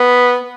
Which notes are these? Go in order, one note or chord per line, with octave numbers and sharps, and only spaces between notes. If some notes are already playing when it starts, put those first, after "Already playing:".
Already playing: B3